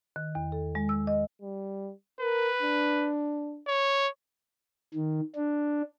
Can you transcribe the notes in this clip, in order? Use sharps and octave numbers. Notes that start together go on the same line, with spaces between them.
D#3
E2
A4
G#3
E6
D#5
G3
A#4 B4
D4
C#5
D#3
D4